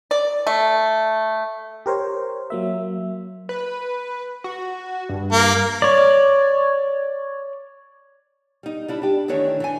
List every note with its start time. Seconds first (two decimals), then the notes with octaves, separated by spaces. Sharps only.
0.11 D5
0.47 A3
1.86 G4 A#4 C5 C#5
2.50 F#3 A#3 E5
3.49 B4
4.44 F#4
5.09 G2
5.32 A#3
5.82 C#5 D5
8.63 G3 D#4
8.88 G3 D4 E4
9.02 D4 G4
9.28 D2 D#3 E3 D4 C#5
9.60 E3 D4 G#5